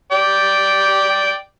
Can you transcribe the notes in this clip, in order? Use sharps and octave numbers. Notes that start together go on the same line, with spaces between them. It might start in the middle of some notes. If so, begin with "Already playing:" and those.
D5 G5